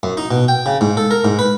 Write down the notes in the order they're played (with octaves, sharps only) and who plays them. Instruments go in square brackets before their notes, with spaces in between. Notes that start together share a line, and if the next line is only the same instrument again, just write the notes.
[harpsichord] F#2
D#4
B2
G5
C#3
G#2
A4
A#4
G#2
B4